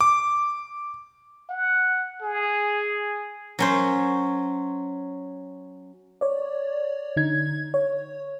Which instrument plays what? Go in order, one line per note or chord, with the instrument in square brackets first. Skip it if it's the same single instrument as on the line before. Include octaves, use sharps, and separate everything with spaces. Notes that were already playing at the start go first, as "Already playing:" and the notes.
[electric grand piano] D6
[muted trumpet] F#5
G#4
[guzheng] F#3 C#4 C5
[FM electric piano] C#5 D5
D3 D#4 G#6
C#5